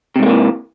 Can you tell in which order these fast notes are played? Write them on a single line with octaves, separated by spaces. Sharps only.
C3 G#2 A3 A#3 E3